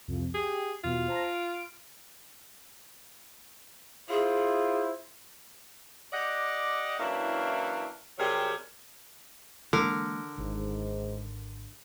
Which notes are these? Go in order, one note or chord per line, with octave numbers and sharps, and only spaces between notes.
C2 F2
G4 G#4
E2 B2 F4
C5 A5 A#5
D7
E4 F4 G#4 C5
G4 D5 D#5 F#5
E3 F#3 A#3 C#4 D4 E4
C3 F#3 G3 G4 G#4 A#4
D3 E3 G#3 A#3 A#4
G#1 G#2